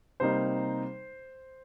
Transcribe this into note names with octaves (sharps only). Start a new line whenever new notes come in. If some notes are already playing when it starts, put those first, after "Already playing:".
C3 G3 A#3 D#4 C5